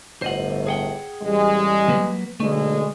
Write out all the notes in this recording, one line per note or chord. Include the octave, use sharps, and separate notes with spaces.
G1 A2 C5 D#5 F#5
G#4 F#5 G5
A1 G3 G#3
F#3 A#3 B4
B1 D3 G#3 A3